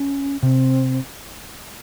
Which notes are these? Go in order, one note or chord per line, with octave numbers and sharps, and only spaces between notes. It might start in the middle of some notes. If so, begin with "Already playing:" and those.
Already playing: C#4
C3 C4